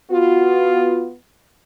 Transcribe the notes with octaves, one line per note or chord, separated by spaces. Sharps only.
B3 F4 F#4